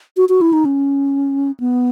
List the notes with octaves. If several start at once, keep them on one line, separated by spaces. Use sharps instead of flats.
F#4
F#4
E4
D#4
C#4
B3